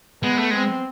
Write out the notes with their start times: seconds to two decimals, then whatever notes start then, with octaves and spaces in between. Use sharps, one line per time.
0.23 G#3 B3
0.38 A3
0.51 G#3 C4